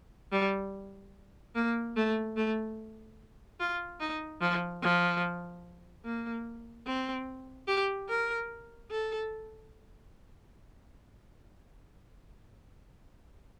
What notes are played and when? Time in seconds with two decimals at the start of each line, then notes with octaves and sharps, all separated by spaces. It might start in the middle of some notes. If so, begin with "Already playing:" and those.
0.32 G3
1.55 A#3
1.97 A3
2.36 A3
3.59 F4
4.00 D#4
4.41 F3
4.82 F3
6.05 A#3
6.87 C4
7.68 G4
8.09 A#4
8.91 A4